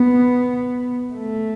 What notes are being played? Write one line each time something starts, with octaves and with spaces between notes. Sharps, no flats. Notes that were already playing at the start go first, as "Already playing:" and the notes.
Already playing: B3
A3